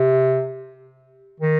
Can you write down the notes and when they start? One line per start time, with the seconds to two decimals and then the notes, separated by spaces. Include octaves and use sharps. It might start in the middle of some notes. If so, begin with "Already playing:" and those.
Already playing: C3
1.40 D#3